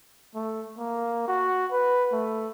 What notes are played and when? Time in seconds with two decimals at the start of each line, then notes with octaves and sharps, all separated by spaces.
0.35 A3
0.78 A#3
1.28 F#4
1.72 B4
2.12 A3